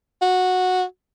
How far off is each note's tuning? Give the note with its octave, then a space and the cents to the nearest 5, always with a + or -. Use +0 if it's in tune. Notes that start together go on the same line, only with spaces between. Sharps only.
F#4 -10